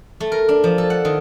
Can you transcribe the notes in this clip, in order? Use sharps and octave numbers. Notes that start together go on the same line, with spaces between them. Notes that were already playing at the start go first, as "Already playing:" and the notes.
A3
A#4
D4
F3
A4
F#5
D#3